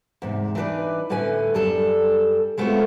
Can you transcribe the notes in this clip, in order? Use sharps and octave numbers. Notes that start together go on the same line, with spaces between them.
E2 G#2 C3
E3 D4 D#4 A#4 B4 D5
D2 A2 D3 C#4 B4 G#5
F#2 G3 D4 A4
G#3 A3 B3 C4 F4 F#4